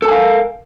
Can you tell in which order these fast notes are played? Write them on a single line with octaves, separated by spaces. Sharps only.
A4 A5 G#5 F5 A#4